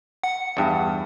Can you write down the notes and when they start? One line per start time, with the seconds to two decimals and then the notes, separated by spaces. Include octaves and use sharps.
0.24 F#5
0.57 E2 G2